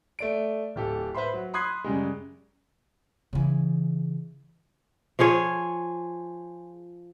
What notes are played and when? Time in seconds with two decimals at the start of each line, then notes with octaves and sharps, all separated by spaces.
0.19 A3 D5 D7
0.76 D1 G4 A4
1.15 B4 C5 E5 B5 C6
1.33 F#3
1.54 B5 C6 D#6 F#6 G#6 C7
1.84 F#2 C#3 G3 G#3
3.33 C#3 E3
5.19 F3 F4 G#4 C#5